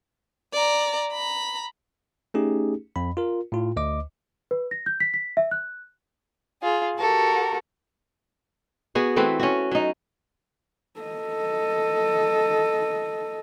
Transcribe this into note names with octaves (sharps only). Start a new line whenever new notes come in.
D5 A#5
A#5 B5
A3 C#4 D#4 G4 G#4
F2 B5
F4 A#4
A2 F4
D2 D#5 D6
B4
A#6
G6
B6
B6
E5
F#6
F4 G#4
F#4 G4 A4 A#4
B3 F#4 G#4
E3 A3 C4 B4
C#4 F#4
F#3 D#4
A4 D#5